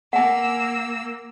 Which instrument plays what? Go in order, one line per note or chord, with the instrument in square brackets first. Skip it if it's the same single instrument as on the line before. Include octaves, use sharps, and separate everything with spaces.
[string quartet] A#3 E6 [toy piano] F#5 G#5